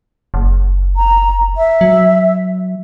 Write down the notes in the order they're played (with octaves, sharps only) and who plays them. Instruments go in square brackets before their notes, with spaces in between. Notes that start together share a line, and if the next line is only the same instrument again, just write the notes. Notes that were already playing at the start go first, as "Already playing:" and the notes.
[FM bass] F#1
[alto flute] A#5
E5
[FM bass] F#3